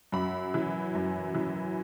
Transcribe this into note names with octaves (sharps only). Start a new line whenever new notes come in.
F#2 B5
E3
F#2
E3